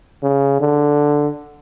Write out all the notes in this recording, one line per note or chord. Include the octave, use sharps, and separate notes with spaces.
C#3
D3